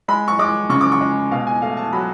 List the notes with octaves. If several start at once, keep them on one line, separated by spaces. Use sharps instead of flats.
G#3 B5
C#6
G#3 D6
C#3 C#6
D6
C#6
G#3
B2 F5
G#5
A3 F5
A5
F#3 B5